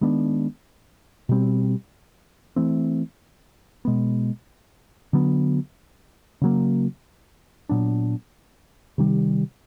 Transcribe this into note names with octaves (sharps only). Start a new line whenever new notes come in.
D#3 G#3 B3 D4
B2 G3 C4
E3 A3 C4
B2 G#3 B3
D3 F#3 B3
C#3 F#3 A#3
A#2 F#3 B3 D4
C3 D#3 G3